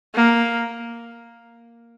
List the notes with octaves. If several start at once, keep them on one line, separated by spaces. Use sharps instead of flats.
A#3